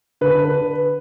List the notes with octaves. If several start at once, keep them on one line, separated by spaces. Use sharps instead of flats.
D3 B4
B4